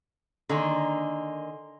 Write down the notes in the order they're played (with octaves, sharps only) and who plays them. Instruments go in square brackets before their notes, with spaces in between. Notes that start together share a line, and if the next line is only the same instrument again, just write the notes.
[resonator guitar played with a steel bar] D3 D#3 A#3 [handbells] D#5 G#5 C6